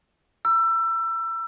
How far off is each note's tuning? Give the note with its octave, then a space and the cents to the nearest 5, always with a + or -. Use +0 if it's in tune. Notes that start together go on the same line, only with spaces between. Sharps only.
A#5 +35 E6 +25